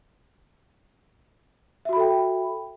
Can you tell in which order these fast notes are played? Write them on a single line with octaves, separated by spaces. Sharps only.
E5 F#4 B5 A4 G5